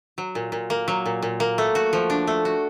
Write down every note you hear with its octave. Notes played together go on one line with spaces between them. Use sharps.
F#3
A#2
A#2
A#3
F#3
A#2
A#2
A#3
A3
F#4
F3
D4
A3
F#4